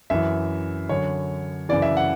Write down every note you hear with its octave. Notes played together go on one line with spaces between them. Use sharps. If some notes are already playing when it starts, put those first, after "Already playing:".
F#2 E3 E5
F#2 D3 C#5
F#2 C#3 E3 D5
E5
F#5